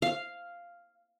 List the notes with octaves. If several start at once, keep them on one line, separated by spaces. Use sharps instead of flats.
F5